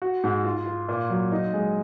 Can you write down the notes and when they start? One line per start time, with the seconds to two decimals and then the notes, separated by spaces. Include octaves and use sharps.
0.02 F#4
0.24 G#2
0.44 F4
0.66 F4
0.89 A#2
1.10 F#3
1.32 D#4
1.54 G#3